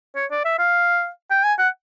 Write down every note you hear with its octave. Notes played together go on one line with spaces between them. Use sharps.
C#5
D5
E5
F5
G5
G#5
F#5